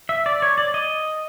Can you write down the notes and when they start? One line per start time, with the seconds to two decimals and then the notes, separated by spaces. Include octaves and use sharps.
0.09 E5
0.26 D5
0.42 C#5
0.58 D5
0.74 D#5